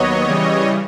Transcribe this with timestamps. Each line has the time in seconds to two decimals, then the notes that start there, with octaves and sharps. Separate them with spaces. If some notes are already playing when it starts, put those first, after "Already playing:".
Already playing: D#2 F#3 B3 C#5 D#5
0.26 C#3 E3 G3